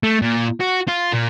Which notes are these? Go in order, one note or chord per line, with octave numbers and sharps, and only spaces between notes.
A3
A#2
F#4
F4
A#2